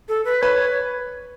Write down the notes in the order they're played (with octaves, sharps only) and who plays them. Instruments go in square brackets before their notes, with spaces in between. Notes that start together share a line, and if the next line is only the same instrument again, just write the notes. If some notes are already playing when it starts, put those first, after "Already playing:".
[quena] A4
B4
[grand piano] B4 [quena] C#5